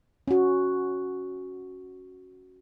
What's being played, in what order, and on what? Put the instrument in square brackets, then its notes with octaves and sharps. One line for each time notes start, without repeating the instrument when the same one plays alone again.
[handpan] C#4 F#4